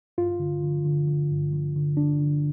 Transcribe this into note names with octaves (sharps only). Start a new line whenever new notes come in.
G2 F4
D3
D3
D3
D3
G2
D3
D3
D3 D4
D3